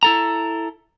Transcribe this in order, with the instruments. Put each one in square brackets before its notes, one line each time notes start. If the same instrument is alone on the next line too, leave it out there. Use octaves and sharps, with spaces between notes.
[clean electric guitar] E4 A4 A#5